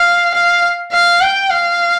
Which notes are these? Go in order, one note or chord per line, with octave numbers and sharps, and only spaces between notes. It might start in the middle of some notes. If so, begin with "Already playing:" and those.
Already playing: F5
F5
F5
G5
F5